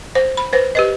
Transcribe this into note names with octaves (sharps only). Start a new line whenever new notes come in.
C5
B5
B4 C5
G4 B4 D#5